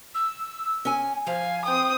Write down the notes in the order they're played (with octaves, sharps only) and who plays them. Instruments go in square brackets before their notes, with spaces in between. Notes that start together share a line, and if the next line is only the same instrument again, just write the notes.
[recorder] E6
[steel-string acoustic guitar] C#4 G#5
[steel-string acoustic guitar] F3 [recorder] F5 [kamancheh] G#5
[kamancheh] C4 D#6 [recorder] G5